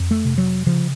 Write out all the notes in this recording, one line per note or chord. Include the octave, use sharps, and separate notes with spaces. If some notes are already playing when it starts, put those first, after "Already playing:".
Already playing: F2
A3
C3
F#3
C#3 F3